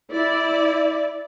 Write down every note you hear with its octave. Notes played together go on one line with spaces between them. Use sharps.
E4 D5